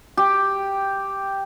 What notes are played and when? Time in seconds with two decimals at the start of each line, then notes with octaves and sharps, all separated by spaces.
0.17 G4